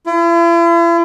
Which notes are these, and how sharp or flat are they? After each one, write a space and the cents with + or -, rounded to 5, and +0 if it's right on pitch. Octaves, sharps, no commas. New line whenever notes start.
E4 +45